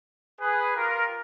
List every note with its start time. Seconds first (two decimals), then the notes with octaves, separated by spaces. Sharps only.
0.40 G#4 B4
0.76 F4 G4 A#4